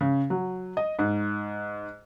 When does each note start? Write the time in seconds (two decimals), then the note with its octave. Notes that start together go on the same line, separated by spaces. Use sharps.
0.01 C#3
0.30 F#3
0.77 D#5
0.99 G#2